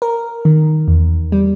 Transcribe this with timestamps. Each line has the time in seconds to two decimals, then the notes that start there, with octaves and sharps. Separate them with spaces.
0.02 A#4
0.45 D#3
0.88 E2
1.32 G3